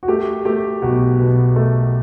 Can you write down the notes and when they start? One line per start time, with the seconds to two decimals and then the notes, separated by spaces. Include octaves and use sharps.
0.03 F#4
0.08 A3 G4
0.45 A3 G4
0.82 B1 F#4
1.19 B2
1.56 A3